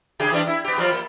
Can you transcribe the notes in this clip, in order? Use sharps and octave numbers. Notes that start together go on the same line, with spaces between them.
C#3 G4 G#4
E3 G3 D4
E4
B3 G4
F3 G3 F4
A#3